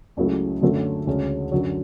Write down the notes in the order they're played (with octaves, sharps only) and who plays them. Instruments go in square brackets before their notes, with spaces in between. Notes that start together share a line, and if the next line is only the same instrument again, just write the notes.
[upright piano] C#2 C#3 F#3 A3 E4
F#2 D3 F#3 A3
D2 C#3 G#3 C#4
F#2 D3 F#3